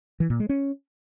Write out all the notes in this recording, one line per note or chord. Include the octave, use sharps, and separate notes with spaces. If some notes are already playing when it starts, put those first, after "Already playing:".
E3
A#2
G#3
C#4